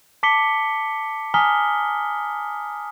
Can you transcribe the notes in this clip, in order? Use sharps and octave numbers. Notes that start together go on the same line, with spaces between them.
A5 D6 B6 C#7 G7
G#5 A#5 D#6 F6 B6 G7